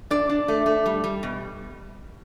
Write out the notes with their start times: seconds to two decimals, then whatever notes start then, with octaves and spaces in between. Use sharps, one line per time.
0.10 D4 D5
0.29 D4
0.48 A3
0.66 A3
0.86 G3
1.04 G3
1.23 B2